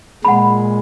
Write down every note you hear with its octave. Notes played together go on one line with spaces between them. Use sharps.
A#2 G#3 F#5 B5